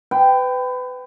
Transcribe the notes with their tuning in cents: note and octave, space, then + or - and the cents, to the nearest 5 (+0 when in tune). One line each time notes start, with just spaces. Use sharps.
B4 +30 G5 +0